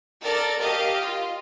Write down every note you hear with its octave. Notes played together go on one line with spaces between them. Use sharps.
A4 A#4 D5 A6
G4 D#5 F5
F4